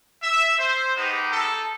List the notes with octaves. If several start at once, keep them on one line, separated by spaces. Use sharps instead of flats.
E5
C5
G#3 B3 D#4 G4
A4